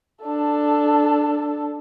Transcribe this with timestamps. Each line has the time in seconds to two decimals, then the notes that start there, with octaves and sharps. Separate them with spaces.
0.24 D4 A4